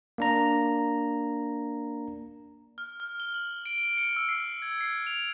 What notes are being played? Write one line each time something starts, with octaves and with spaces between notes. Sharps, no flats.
A#3 D4 A#5
F6
F6
G7
F#7
D7
D7
C#7
E6
C7
G#6
C7
F7